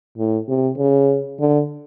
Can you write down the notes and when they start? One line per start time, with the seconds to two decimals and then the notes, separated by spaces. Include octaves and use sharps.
0.18 A2
0.48 C3
0.78 C#3
1.40 D3